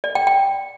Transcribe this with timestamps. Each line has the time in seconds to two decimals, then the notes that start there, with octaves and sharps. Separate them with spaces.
0.04 D5
0.15 G5
0.27 G5